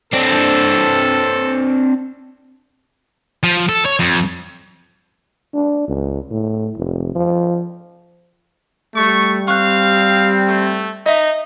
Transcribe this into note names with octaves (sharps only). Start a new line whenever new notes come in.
C4 D4 A4
F3
A4
C#5
F2
D4
C#2
A2
F1
F3
G3 A3 C#6
C4 F5 C#6 F#6
A3
D#4 D#5 E5